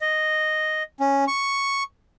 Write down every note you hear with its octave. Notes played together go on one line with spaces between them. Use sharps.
D#5
C#4
C#6